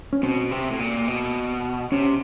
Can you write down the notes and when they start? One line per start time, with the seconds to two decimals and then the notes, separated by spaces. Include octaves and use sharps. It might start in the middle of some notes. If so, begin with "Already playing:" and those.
0.13 C#4
0.23 B2 C4
0.51 C3
0.71 A2
0.79 A#2
1.08 B2
1.92 C3 C#4